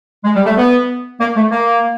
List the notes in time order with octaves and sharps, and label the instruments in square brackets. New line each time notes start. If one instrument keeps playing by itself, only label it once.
[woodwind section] G#3
G3
A3
B3
A#3
A3
A#3